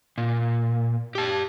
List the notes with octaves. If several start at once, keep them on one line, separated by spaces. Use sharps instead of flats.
A#2
G4 A5